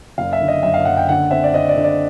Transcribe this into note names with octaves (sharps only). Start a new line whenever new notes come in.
F#1 F5
E5
D3
D#5
F#2 E5
F5
F#1 F#5
G5
D3 F#5
C4 E5
D5
C4 D#5
D5
D3
D5